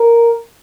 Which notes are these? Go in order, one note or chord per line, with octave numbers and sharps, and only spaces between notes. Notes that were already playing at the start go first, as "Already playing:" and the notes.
Already playing: A#4